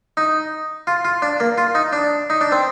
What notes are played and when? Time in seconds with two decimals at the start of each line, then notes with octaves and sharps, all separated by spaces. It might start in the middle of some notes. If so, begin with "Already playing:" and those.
0.17 D#4
0.87 F4
1.05 F4
1.22 D4
1.40 A#3
1.58 F4
1.75 D#4
1.93 D4
2.30 D#4
2.41 D4
2.52 C4